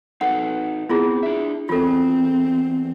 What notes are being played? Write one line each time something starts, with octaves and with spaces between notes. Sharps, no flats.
D#4 A4 B4 F#5
B3 C4 E4 F4 G#4
D4 E5
E2 C4 F4 A4